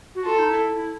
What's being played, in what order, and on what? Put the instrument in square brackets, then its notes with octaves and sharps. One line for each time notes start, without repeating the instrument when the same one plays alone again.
[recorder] F#4
[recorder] F4 [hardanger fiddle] A4
[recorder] D#4
E4
E4